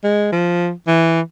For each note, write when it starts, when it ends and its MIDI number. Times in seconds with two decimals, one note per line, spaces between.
0.04 0.31 56
0.32 0.71 53
0.87 1.21 52